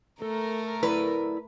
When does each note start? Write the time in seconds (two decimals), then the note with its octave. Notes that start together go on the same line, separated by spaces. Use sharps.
0.22 A3 A4 A#4
0.83 E4 A4 B4 D5